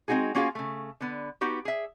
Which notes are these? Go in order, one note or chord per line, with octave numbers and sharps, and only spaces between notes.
G#3 C4 D#4 F#4 G#4
A#3 C#4 F4 F#4 G#4 F5
C#3 A3
D3 B3
B3 D#4 F#4 G4
G#4 E5